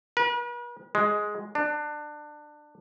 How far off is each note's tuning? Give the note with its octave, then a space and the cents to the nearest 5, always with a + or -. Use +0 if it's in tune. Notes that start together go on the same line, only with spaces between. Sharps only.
B4 -45
G#3 +5
D4 +25